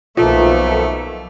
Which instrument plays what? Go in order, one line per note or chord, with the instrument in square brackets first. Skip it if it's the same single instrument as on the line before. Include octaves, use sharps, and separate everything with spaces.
[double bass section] B1 [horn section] B2 A3 [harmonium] D#3 F3 A#3 [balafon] F4